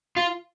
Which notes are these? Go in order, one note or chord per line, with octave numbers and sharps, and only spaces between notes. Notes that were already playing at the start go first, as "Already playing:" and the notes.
F4